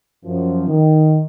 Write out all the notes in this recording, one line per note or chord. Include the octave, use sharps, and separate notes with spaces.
F#2 F3
D#3